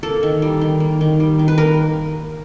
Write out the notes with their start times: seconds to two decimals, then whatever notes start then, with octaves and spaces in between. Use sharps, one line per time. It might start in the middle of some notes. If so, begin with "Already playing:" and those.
0.03 A#3 A4
0.23 D#3
0.42 G3
0.61 D#3
0.80 A#3
1.01 D#3
1.20 G3
1.39 D#3
1.48 B4
1.58 A#3 A#4